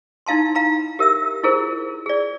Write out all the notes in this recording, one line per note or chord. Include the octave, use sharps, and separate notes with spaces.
D#4 E4 F5 A5 C6
F5 A#5 B5
G4 A#4 E5 E6
E4 F4 G#4 A#4 C5
G#4 D5